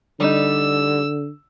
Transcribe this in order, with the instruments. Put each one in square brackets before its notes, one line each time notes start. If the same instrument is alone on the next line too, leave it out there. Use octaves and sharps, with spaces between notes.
[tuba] D3 [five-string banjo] G3 D#4 [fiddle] E6